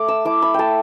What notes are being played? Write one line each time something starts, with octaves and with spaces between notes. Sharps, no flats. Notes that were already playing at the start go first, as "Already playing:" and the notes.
Already playing: A3 D6
E6
E4 D6
B5
A3 G5 A5